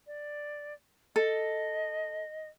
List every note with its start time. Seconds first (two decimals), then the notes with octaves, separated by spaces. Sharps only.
0.07 D5
1.16 A4 D#5